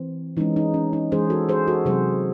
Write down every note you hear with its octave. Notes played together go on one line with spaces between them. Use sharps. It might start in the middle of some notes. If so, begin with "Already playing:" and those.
Already playing: E3 C4
E3 G#3 C#4 D#4
D#4
C#4
D#4
E3 G#3 C#4 G#4 C5
F#4 A4
G#4 C5
F#4 A4
C3 F#3 C4 G#4 C5